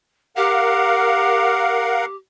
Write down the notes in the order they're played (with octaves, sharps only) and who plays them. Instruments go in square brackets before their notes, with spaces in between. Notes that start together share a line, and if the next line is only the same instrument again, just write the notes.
[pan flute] G4 [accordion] A#4 F5 F#5